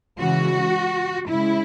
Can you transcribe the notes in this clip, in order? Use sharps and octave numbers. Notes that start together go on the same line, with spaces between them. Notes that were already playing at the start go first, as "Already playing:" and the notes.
C#3 E3 G#3 F#4
C#3 G#3 E4